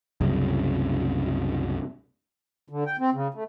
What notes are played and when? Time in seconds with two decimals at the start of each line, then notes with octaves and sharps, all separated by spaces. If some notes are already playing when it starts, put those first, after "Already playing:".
0.21 C2 F#2 C#3
2.69 D3
2.86 G5
2.99 C4
3.14 C#3
3.34 A3